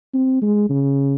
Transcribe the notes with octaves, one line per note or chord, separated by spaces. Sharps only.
C4
G#3
C#3